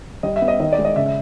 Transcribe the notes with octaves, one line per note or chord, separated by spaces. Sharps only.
G3 D#5
E5
B3
D#5
D#3 D#5
D5
G#3
D#5
C#3 E5
E5